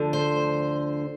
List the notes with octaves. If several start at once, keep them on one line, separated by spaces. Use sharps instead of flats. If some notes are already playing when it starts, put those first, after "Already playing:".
Already playing: D2 D3 F3
C5